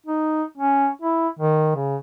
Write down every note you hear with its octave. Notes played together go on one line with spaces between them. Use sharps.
D#4
C#4
E4
D#3
C#3